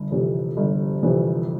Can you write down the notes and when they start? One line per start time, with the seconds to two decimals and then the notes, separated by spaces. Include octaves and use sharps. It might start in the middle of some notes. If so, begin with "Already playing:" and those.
Already playing: G1
0.11 F2 C3 E3
0.57 G1
1.03 F2 C3 E3